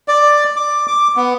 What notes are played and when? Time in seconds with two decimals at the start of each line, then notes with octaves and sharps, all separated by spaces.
0.08 D5
0.56 D6
0.88 D6
1.16 B3